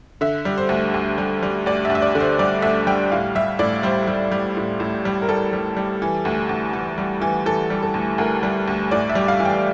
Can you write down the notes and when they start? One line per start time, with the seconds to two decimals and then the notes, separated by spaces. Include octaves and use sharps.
0.21 D3 E5
0.45 G3
0.58 C5
0.69 D2
0.94 D2
1.18 G3
1.43 G3
1.66 D2 D5
1.85 E5
1.90 D2
1.95 E5
2.02 D5
2.15 D3
2.20 C5
2.39 G3 D5
2.62 D2 E5
2.87 G3 G5
3.12 A2 F5
3.35 G3 E5
3.59 A2 D5
3.83 G3 C5
4.07 G3
4.32 G3
4.57 A2
4.80 A2
5.05 G3
5.22 A#4
5.29 G3 A4
5.53 G3
5.77 G3
6.02 E3
6.25 D2
6.49 D2
6.73 E3
6.98 G3
7.22 E3
7.46 E3 A4
7.70 G3
7.83 A4
7.94 D2
8.18 D2 A#4
8.43 G3
8.68 D2
8.91 A2 D5
9.09 E5
9.15 G3
9.28 F5
9.40 E3
9.45 G5